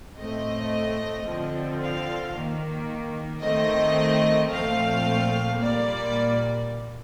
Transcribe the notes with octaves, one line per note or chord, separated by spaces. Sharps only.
A2 A3 C4 D#5
D3 F3 C4
F5
D#3 A#3
D#3 A3 C4 D#5
A#2 F3 A3 C4 F5
A#2 G3 A#3 D5